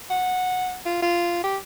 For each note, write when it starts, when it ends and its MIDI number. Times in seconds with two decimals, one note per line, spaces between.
0.10 0.76 78
0.85 1.00 65
1.02 1.43 65
1.43 1.57 67